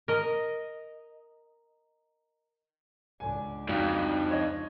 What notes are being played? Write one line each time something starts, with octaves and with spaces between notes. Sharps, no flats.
A#4 D#5
C#2 D4 G#5
F2 F#3 D#4 D5 F5
C#5 D#5